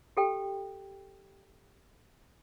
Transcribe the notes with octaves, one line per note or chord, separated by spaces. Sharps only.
G4 A4 G5